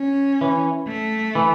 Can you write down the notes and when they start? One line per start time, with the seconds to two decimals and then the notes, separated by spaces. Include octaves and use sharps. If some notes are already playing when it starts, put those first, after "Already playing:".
Already playing: C#4
0.41 E3
0.88 A3
1.35 E3